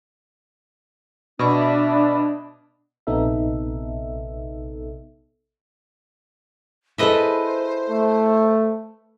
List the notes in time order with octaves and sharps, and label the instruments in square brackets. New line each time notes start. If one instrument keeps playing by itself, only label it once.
[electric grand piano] B2 C#6 [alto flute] D4 [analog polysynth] D5 E5 B5
[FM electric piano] A#1 C3 B3 D#4 A4 E5
[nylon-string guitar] E4 G#4 A4 [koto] B4 D#5 E5 [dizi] C5
[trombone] A3